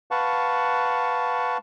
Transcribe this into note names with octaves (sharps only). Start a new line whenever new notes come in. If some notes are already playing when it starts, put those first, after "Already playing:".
B4 F5 F#5 A5 C#6